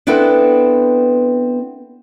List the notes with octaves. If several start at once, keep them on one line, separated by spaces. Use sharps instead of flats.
B3 C4 D4 E4 A4 B4